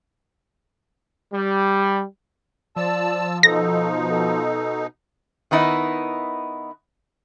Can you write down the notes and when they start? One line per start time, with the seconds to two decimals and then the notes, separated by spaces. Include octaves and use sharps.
1.32 G3
2.76 F3 D5 A5 E6
3.43 B2 D#4 A4 A#6
4.09 A4
5.51 D#3 B3 D#4 E4